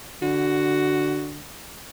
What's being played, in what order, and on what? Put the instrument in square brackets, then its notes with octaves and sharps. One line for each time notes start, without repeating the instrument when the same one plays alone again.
[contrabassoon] D3 [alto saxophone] F#4